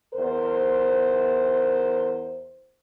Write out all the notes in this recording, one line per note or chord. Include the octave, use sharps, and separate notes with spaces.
E2 A#4 C5